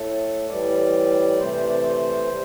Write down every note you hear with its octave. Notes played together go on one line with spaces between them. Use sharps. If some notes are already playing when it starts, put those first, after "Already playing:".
Already playing: A2 A3 A4
A2 E3 G3 D5
C3 E3 A3 C5
C5
D5
C5
C3 G3